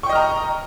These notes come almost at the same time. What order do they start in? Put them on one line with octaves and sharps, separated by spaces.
C#6 G5 D#5 F6 A#5